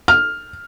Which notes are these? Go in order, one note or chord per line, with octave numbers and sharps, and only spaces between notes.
F6